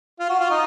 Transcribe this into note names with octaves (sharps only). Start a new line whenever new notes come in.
F4
F#4
F4
D#4